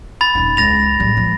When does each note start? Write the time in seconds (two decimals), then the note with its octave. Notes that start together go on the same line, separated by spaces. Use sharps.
0.21 B5 A6
0.35 D#1 D#4
0.57 C#2 A6 A#6 F7
1.00 D1 G3
1.17 F3 A#3